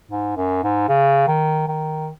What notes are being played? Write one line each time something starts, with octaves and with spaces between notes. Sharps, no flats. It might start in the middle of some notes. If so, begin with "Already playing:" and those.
G#2
F#2
G#2
C#3
D#3
D#3